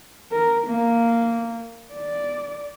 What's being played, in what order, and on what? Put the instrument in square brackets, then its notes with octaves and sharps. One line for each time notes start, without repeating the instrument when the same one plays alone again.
[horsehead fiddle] A#4
A#3
D5